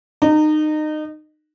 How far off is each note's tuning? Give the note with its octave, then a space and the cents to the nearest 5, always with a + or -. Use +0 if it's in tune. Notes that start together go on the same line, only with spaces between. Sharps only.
D#4 -25